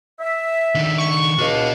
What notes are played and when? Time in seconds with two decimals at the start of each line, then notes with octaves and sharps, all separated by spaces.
0.20 E5
0.75 D#3 D4
0.98 C#6
1.38 C#2 D4 F#4 D#5 F5